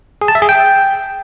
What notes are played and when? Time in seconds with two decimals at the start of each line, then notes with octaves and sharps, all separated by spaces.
0.22 G#4
0.28 A5
0.35 E5
0.42 G#4
0.49 G5